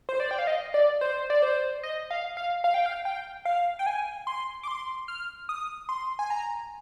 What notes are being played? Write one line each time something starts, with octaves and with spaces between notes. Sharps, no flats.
C5
D5
G5
F5
D#5
D5
C5
D5
C5
D#5
F5
F5
F5
G5
F5
G5
F5
G5
G#5
C6
D6
C6
F6
D#6
C6
G#5
A#5